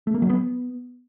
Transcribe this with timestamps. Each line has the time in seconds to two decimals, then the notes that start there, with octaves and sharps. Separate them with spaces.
0.07 A3
0.14 A#3
0.22 F#3
0.30 B3